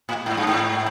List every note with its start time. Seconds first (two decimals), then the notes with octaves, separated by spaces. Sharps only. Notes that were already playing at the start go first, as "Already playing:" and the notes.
0.09 A2
0.26 G#2
0.37 G2
0.47 G#2